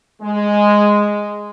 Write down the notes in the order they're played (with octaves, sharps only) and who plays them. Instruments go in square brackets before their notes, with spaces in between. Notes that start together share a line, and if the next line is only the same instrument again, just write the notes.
[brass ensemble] G#3